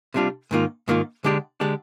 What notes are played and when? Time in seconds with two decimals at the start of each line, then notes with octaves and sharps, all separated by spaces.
0.14 C3 G3 D4 F4
0.51 G#2 D#3 A#3 F4
0.88 G#2 D#3 A#3 F4
1.24 D3 G#3 D4 G4 D5
1.60 D3 G#3 D4 G4 D5